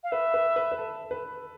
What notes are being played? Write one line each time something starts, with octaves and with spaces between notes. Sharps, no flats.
F5
B4 E5
B4
B4
B4
A4
B4